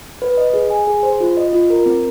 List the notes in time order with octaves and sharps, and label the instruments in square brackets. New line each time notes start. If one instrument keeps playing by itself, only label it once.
[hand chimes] B4
D#5
G#4
G#5
G#4
C5
F4
D#5
F4
A#4
C4